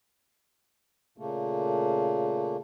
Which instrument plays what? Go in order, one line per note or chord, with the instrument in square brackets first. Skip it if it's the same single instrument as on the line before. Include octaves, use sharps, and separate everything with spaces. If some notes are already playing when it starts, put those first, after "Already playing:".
[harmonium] A#2 C#3 A3 A#3